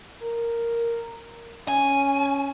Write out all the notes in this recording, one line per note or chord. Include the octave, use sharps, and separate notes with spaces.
A#4
C#4 G#5